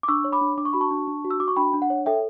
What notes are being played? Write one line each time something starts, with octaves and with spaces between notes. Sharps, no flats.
D6
D4 C#6 E6
C#5
B5 D6
D4
D4 D6
C#6
F#4 B5
A5 C#6
D4
D4
F#4
E6
F#4 D6
C#6
D4 G5 B5
D4
F#5
C#5
A4 E5 G5